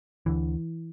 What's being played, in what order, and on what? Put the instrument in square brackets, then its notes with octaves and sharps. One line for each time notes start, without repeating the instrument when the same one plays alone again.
[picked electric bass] D2 D3 E3